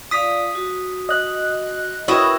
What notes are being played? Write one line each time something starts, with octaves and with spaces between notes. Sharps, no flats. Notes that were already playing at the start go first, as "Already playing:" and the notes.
F4 D5 F5 D#6 B6
F#4
D#5 F#6
E4 F#4 A#4 B4 C#5 D#5 G5 E6